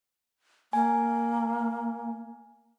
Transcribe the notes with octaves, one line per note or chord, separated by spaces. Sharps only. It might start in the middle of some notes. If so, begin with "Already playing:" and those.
A#3 G#5